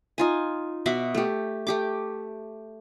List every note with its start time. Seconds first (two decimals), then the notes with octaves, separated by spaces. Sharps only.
0.18 D#4 F4 G#5
0.86 B2 F#4 E5 D6
1.15 A3 G4
1.67 A3 G4 D6